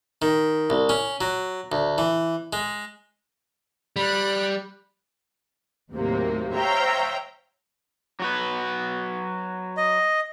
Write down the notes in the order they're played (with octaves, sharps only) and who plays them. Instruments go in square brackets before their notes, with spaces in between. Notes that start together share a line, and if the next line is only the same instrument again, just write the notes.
[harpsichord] D#3
C2
C#4
F#3
D2
E3
G#3
[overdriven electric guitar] G3 [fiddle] B5 F#6
[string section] D#2 A2 C3 F#3 A#3
C5 C#5 E5 F5 G5 A#5
[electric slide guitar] F#3 F#4 B4
[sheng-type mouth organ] D#5